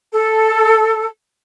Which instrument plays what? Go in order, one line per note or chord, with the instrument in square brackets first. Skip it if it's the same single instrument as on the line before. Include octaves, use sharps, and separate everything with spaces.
[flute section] A4